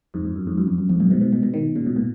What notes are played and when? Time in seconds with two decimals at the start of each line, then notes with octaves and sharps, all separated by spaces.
0.14 F2 G#2
0.25 F2
0.36 F#2
0.47 F2 G#2
0.58 F#2
0.68 F2
0.78 F#2
0.89 F2 G#2
1.00 F#2 A#2
1.10 G#2 B2
1.21 G#2 B2
1.32 G#2 B2
1.43 G#2 B2
1.54 B2 D#3
1.75 A#2 C#3
1.86 G#2 B2
1.96 A#2